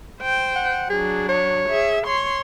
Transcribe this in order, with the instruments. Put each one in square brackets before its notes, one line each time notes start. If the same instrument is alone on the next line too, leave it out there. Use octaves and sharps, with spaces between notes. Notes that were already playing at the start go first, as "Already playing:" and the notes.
[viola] C5 G5
[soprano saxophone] F#5
[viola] F#3 D4 [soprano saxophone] G#4
[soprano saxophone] C#5
[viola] G#4 E5
C#5 C6